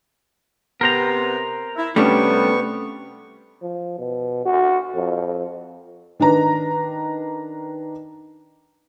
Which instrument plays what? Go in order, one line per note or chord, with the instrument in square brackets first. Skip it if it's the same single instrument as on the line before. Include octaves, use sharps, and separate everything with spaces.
[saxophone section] C3 B3 [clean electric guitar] A#4 C5 A#5
[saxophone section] E4
[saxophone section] C3 G4 [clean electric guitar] G3 [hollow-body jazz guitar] A3 C#4 D4 [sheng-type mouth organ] B3 C#6
[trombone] F3
B2
F#4
F2
[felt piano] D#3 D4 B4 A#5